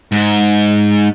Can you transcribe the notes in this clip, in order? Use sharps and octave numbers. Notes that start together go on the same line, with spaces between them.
G#2